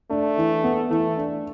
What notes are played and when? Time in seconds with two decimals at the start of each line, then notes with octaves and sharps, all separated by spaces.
0.10 A3 D4
0.37 E3
0.64 B3
0.90 E3 A3
1.17 D4